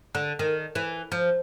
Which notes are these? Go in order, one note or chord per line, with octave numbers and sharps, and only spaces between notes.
D3
D#3
E3
F3